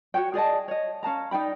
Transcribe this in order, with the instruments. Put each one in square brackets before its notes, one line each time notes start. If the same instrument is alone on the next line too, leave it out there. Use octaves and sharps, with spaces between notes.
[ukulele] F#4 G#4 C#5 G5
G#4 D5 D#5 A5
C#5 D#5
C#4 F5 A5 A#5
D#4 D5 G5 B5